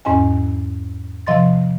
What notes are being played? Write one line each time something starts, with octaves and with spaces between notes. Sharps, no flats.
E2 G#2 C#4 D#5 G#5
C3 F3 D#5 C6 A6